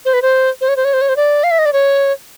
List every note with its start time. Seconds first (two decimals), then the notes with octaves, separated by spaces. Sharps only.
0.05 C5
0.14 B4
0.22 C5
0.61 C5
0.69 C#5
0.77 C5
0.85 C#5
0.93 C5
1.01 C#5
1.09 C5
1.16 D5
1.44 F5
1.51 E5
1.59 D#5
1.66 D5
1.73 C#5